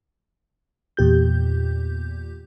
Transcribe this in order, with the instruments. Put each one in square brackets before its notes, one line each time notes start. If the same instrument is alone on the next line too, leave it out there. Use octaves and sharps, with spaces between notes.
[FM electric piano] E2 A#2 G4 G6